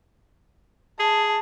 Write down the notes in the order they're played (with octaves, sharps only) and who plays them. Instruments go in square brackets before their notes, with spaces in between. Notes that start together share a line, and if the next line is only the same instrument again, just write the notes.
[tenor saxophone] G#4 [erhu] A5